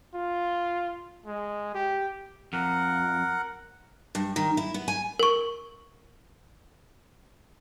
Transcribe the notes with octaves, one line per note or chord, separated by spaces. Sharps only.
F4
G#3
G4
F2 A#4 F#5
G2
D#3
E4
B3
G#5
A#4 C#6